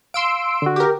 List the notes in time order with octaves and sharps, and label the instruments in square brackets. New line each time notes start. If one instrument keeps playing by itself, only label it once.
[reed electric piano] F5 [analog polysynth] C6 E6 D7
[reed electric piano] D3 F#4
[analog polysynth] G4 A#4